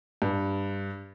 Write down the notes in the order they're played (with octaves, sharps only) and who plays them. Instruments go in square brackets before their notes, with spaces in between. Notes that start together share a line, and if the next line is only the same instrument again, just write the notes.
[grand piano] G2